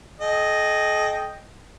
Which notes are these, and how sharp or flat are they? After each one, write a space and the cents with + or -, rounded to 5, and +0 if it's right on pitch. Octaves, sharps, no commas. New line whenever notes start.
A4 -45 D#5 +0 G5 +0